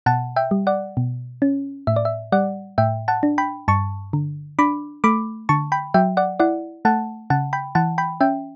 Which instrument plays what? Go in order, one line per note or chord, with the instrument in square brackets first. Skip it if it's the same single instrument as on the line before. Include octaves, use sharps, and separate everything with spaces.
[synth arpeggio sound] B2 F#5 A5
E5 G5
G3
D5 F#5
B2
C#4
A2 E5
D5
E5
G3 D5 F#5
A2 E5 G5
F#5 A5
D4
G5 B5
G2 A5 C#6
D3
D4 B5 D6
A3 B5 D6
D3 A5 C#6
G5 B5
F#3 E5 G5
D5 F#5
E4 D5 F#5
A3 F#5 A5
C#3 F#5 A5
G5 B5
E3 F#5 A5
G5 B5
C#4 E5 G5